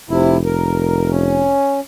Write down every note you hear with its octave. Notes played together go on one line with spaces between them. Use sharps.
F1 C3 E4
A#4
C#4